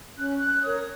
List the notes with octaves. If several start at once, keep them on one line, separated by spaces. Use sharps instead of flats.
C#4 F#6
F#6
A#4 C#5 D#6